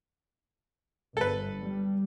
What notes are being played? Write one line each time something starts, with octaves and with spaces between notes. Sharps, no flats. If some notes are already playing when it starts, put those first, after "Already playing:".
G1 A4 B4
G3